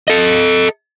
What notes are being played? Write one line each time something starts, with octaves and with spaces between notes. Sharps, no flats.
A4 D#5